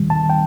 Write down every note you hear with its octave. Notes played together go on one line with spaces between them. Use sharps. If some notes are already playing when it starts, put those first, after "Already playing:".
Already playing: D#2 D#3 G3
A5
G5